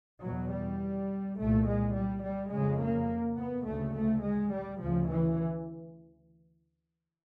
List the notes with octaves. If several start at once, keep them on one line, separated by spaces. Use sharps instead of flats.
E2 B2 F#3
G3
C2 A#2 A3
G#3
G3
G3
F2 C#3 G#3
A#3
B3
D2 C#3 A3
A3
G#3
G3
D2 C#3 F3
E3